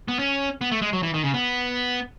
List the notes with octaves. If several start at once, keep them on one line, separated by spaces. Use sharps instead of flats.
B3
C#4
B3
A3
G#3
F#3
E3
D#3
C#3
B3